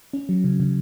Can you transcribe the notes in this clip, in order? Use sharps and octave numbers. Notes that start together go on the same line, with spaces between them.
C#4
F#3
C#3
C#3